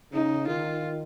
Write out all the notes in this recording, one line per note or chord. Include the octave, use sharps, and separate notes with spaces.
C#3 D#4
D#3 F4